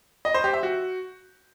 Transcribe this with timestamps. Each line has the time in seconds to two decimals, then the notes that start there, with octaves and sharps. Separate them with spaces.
0.25 D#5
0.34 C5
0.44 G4
0.53 E5
0.63 F#4